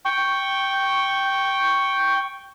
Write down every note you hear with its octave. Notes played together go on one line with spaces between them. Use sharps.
G5 C#6